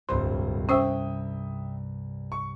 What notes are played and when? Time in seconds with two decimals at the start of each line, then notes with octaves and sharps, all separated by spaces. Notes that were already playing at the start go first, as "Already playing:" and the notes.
0.09 D1 C2 G2 C5 C6
0.69 C#4 C5 E5 G5 D#6 E6
2.32 C#6